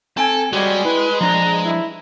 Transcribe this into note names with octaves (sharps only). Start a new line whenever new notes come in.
C4 A4 G5 G#5
G3 G#3 F#4 G4 C#5
E4 B4
F3 D4 A#5
E4